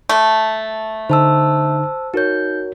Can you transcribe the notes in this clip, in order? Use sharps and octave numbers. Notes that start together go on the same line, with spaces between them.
A3
D3 D#4 C5 A5 E6
D#4 F#4 A#4 C#5 G6